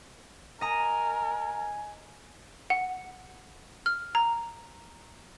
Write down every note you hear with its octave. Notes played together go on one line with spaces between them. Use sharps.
A#4 D#5 G#5 A#5
F#5
F6
A#5